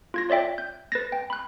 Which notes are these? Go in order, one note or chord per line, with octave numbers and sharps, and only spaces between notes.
F4 G#6 A#6
F4 C#5 D5 E5 G5
G6
B4 A6 A#6
G5
B5 F#6